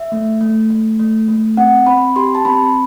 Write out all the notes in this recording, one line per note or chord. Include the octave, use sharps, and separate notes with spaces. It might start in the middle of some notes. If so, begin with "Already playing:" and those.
Already playing: E5
A3
A3
A3
A3
A3
C4 F#5
C4 B5
G4 C6
A5
C4 B5